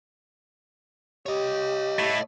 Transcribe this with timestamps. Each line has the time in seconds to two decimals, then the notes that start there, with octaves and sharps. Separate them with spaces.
1.26 G4 C#5 D#5
1.99 A3 E4